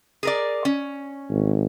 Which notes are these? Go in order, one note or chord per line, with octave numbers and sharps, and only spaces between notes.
G#4 A#4 D5
C#4
G#1